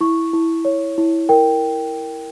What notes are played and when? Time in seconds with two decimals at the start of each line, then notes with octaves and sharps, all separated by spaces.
0.01 E4 C#6
0.33 E4
0.65 C#5
0.98 E4
1.29 A#4 G5